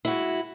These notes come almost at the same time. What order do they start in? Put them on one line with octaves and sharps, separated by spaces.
E4 F#4 G#3